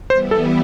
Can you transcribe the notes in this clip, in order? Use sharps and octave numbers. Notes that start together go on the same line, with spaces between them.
E3 G3 B3 E4 C5
A4